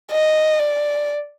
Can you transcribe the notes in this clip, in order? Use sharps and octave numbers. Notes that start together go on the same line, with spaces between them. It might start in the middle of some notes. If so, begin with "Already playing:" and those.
D#5
D5